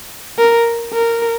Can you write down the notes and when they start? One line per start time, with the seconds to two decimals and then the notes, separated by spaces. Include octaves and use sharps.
0.39 A#4
0.93 A#4